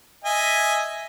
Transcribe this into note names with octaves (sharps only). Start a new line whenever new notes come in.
D#5 E5 G#5